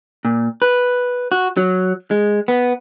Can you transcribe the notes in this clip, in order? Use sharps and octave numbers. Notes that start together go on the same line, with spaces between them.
A#2
B4
F#4
F#3
G#3
B3